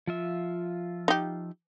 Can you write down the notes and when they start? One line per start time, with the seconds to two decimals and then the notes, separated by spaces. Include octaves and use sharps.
0.07 F3 F4 E5
1.08 D#4 G4